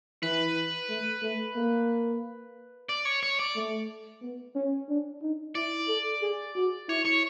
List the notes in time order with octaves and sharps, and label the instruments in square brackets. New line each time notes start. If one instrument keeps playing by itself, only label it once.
[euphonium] E3 [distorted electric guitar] B4
[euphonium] A3
A3
A#3
[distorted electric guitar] D5
C#5
C#5
D5
[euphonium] A3
B3
C#4
D4
D#4
[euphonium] E4 [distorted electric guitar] D5
[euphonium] A4
G#4
F#4
[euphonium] E4 [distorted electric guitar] C#5
[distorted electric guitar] C#5